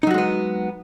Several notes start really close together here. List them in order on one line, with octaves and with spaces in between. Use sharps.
D#4 F#3 F#4 G#3 B3